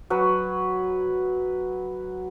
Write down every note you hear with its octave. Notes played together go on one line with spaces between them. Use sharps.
F#3 B4